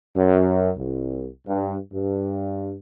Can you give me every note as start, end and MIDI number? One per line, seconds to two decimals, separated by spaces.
0.16 0.72 42
0.77 1.27 36
1.48 1.77 43
1.93 2.75 43